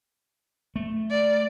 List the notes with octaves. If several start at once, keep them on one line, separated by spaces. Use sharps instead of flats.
A3
D5